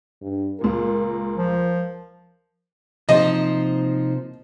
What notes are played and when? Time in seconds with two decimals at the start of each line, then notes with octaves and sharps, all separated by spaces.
0.22 G2
0.61 C#2 A#2 A#4
1.36 F3
3.09 C3 F3 A#3 D#4 C5 D#5